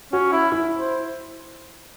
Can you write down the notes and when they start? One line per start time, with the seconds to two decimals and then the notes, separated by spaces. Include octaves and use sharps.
0.12 C#4 F#4
0.32 E4
0.52 E4
0.78 C5